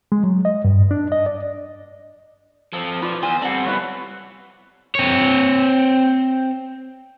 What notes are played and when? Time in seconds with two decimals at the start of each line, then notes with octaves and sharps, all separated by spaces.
0.12 G#3
0.23 F#3
0.45 D#5
0.64 G2
0.91 D4
1.12 D#5
1.26 D5
2.73 F3 C4 A4
3.02 F4 B4 D5
3.23 E2 C5 G#5
3.42 G3 C4 A4 D5 F#5
3.65 C2 B3 E4 B4 C#5
4.95 C4 C#5